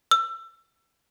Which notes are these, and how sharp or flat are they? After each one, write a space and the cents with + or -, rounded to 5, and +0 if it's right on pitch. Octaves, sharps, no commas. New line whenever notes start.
E6 +25